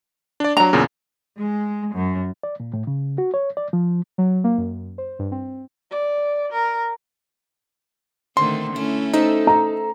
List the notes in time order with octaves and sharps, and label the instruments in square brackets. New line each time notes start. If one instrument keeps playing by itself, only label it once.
[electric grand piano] D4 D5
[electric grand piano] F#3 D4 [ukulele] A#5
[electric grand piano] E2 A#2 C#3
[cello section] G#3
F#2
[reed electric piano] D5
A#2
A2
C#3
F#4
C#5
D5
F3
[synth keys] F#3
A#3
F#2
C5
G2
C4
[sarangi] D5
A#4
[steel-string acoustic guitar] A#2 C4 [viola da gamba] D3 D#3 A3 [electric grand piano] C6
[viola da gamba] A3 C#4 [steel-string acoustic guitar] E4
[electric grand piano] D#4 [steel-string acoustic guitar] A4 C5 E5
[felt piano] A#5